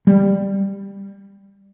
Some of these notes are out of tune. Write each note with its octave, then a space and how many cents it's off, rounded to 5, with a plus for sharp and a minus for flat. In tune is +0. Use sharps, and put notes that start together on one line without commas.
G3 +10